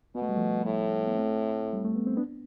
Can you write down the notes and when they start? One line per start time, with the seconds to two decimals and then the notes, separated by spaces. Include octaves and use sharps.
0.15 B2 B3
0.22 A3
0.29 G3
0.36 F3 A3
0.65 A2
1.06 B3
1.16 A3 C4
1.73 G3
1.85 A3
1.95 B3
2.07 C4
2.17 B3 D4